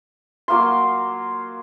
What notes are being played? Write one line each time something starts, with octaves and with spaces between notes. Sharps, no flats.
F#3 A#3 F5 C6